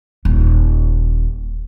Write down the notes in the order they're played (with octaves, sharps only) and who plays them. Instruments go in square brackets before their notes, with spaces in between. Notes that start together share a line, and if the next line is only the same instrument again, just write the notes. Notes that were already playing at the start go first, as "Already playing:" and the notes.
[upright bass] D#1 D#4